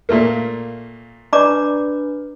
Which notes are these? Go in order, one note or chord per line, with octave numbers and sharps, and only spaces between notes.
A#2 A3 A#3
D4 B4 D5 A#5 D6